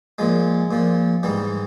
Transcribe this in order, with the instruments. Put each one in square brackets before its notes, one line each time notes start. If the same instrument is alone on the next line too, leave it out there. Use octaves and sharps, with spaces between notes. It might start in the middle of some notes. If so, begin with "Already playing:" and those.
[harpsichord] A#2 F3 G#3
A#2 F3
G#2 E3 G3